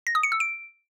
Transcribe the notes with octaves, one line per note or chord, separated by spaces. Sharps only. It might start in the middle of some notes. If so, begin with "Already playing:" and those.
A#6
D#6
C#7
E6
D7